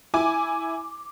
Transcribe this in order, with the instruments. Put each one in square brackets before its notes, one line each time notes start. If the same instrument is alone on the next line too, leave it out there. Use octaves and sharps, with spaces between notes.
[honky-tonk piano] E4 G#5 D6